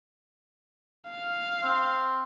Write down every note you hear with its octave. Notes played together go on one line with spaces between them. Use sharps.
F5
C4